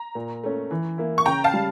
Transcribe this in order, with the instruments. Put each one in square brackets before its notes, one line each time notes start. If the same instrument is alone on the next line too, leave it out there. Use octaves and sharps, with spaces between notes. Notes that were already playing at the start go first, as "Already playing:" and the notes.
Already playing: [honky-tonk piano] A#5
[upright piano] A#2
A3 C#4
E3
A#3 E4
[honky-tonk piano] C#6
[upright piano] C#3 [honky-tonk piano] G5 A#5
[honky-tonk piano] F5 A5
[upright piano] G3